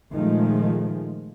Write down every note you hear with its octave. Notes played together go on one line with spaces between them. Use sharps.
A#2 D#3 F3 G#3 A3